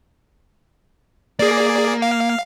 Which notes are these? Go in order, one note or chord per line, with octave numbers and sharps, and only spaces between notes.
A#3 G#4 D5
F5